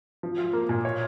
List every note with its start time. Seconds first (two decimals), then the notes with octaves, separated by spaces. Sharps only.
0.23 F3
0.38 F4
0.53 A#3
0.69 A#2
0.85 C#5